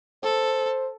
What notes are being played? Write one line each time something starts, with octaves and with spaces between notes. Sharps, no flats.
A4 C5